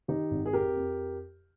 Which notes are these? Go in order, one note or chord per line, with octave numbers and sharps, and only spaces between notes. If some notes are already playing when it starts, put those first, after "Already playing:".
D#3 D#4 G4
G#1
G#4
F2 G4 A#4
F2